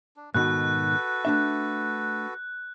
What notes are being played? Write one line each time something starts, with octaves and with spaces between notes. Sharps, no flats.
D4
G#2 B2 D#3 F#4 A4 B4 F#6
A3 D4 E5